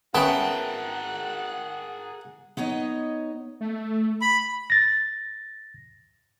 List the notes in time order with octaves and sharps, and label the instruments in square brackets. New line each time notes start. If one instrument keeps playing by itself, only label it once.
[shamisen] B3 C#4 [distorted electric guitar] G#4 A#4 [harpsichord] E5 G5 A5 [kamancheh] F#5
[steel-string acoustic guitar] B3 D#4 C#5 D#5
[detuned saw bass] A3
[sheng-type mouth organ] B5
[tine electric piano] A6 A#6